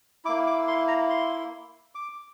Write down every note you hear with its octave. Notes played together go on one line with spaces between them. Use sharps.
A#3 E4 D6
D6
C6
A#5
C6
D6